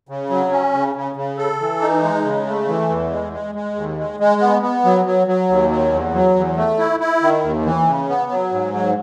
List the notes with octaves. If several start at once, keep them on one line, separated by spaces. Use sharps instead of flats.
C#3
F#3
C#4
C#3
C#3
C#3
A4
E3
D#4
G#3
C#3
A3
E3
E2
G#3
G#3
G#3
D#2
G#3
G#3
B3
B3
F#3
F#3
F#3
D#2
F#3
E2
F#3
E2
A3
E4
E4
D#3
D#2
E3
C#3
B3
F#3
G#2
F#3